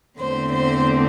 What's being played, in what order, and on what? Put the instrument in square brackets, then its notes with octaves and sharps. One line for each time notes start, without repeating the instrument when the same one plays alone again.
[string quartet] E2 D3 A3 C4 C5
C5